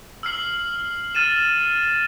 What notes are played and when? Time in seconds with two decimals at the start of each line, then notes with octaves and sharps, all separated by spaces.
0.23 E6 F6 C7 F#7
1.15 F6 A6 D#7 E7